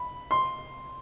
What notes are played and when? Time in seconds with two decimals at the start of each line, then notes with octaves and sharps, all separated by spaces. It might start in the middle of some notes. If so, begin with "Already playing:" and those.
Already playing: B5
0.31 C6